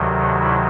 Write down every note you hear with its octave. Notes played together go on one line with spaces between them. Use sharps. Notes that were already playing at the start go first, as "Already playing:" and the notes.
Already playing: D2 C3 D#3 F#3
E4